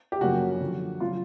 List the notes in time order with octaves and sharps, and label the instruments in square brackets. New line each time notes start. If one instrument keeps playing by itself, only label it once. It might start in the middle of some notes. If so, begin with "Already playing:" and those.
[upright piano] G4
F#2 C#3 F3 A#3 C#4 F#4
F#2 D3 F3
C#3 F#3 F4